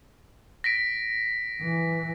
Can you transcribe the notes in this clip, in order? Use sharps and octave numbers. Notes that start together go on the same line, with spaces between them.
A#6 B6 D7
E3